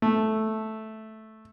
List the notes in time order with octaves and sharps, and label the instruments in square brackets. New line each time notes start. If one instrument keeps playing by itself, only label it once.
[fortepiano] A3